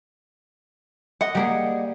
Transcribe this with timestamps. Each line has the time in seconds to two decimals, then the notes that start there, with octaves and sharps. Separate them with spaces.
1.21 D#5 F#5
1.35 G3 A#3 G#4